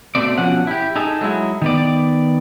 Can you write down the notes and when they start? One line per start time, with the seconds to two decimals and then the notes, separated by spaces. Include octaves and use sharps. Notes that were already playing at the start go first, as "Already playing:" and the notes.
0.15 B2 A3 C4 D5
0.38 B2 F3 C#4 F#5
0.67 E4 G4
0.96 D#4 G#4 A4
1.21 F#3 G#3 E4
1.62 D#3 B3 D5